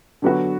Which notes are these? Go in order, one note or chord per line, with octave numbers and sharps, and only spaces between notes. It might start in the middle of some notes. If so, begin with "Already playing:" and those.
D3 F#3 B3 F#4